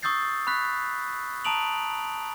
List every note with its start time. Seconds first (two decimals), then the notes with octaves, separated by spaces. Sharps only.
0.03 C#6 D#6 E6 G6 A6 C7
0.47 B5 C#6 F#6 B6
1.44 A5 A#5 D#6 D7 F7 F#7